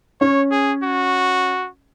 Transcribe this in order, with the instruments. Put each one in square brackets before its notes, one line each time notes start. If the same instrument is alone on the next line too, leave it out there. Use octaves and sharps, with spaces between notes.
[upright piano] C#4 [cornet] C#5
[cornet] G#4
F#4